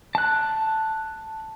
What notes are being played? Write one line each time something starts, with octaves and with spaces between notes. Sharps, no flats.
A5 F#6